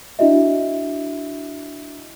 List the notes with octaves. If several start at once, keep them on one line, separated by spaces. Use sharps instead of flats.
D4 E4 F#4 D#5 E5